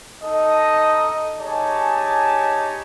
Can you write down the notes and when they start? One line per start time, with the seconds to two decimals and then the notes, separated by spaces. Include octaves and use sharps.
0.23 D#4 A4 D#5
1.40 D#4 G4 G#4 C#5 G#5 A5